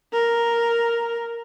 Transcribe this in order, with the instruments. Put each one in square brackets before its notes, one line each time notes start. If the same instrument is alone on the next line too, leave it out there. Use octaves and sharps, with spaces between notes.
[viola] A#4